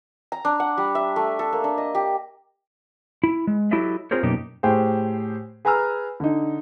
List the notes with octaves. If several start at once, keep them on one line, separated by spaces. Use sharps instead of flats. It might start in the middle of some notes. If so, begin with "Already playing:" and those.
A#5
D4
F#5
G3
E5
A3
A4
A#3
D4
D#5
G4
E4
G#3
F#3 E4 G4 A4 D#5 E5
C4 F4 G#4 A#4 C5 C#5
F#2 B2 A#3 D#4 G4
A2 G4 G#4 C5
G#4 B4 G#5 A#5 E6 F6
D3 D#4